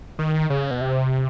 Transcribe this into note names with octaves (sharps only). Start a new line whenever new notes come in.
D#3
C#3
B2
C3